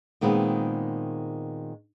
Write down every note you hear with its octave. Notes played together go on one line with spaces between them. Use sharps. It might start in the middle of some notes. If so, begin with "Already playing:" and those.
A#2 D#3 G#3 B3 C4